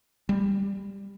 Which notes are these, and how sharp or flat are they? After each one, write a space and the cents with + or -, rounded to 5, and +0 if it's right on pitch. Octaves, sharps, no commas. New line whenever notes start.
G3 +5